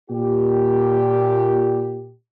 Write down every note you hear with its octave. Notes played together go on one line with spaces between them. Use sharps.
A#2 G4